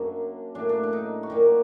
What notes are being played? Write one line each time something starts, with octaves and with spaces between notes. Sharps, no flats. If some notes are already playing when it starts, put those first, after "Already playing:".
Already playing: F#2 F#3 A#3 D4
A2 F#3 A#3 D4
D4
D4
D#4
F#4
A#2 F#3 A#3 G4